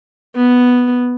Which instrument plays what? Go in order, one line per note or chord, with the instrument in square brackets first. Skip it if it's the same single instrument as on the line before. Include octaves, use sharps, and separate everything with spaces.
[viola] B3